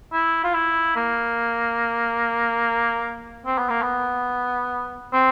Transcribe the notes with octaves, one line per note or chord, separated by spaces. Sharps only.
E4
F4
E4
A#3
C4
B3
A#3
B3
C4